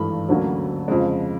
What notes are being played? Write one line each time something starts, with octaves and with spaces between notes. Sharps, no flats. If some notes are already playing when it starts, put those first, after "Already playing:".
Already playing: G#1 G2 E3 A3 B5
D2 D3 F#3 A#3 C#4
F2 C#3 F3 G#3